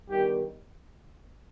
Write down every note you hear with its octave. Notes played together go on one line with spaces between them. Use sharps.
G2 D#3 G3 B3 G4